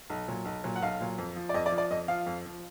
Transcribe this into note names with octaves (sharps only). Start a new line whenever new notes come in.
B1
A#2 F#3
B1
A#2 F#3
F#5
B1 F5
A#2 F#3
F2
F3
D5
F2 D#5
D5
F3
D5
F2 D#5
F3 F5
F2
F3